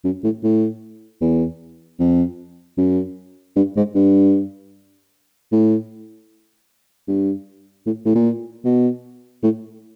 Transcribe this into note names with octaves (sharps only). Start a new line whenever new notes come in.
F#2
A2
A2
E2
F2
F#2
G2
G#2
G2
A2
G2
A2
A2
A#2
B2
A2